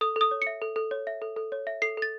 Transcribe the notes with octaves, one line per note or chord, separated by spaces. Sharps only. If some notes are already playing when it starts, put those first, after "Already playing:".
A4 D#6
A4 D#6
C#5
C#7
E5
A4
A4
C#5
E5
A4
A4
C#5
E5
A4 C7
A4 A6